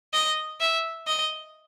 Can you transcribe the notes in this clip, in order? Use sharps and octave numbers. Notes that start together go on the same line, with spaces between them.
D#5
E5
D#5